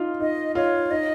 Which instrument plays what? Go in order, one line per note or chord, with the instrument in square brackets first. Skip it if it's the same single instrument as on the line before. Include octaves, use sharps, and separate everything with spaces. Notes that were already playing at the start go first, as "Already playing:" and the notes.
Already playing: [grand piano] D#4 F4
[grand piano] D#4 [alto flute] D#5
[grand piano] F4 [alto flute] C#5
[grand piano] D#4 [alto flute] D#5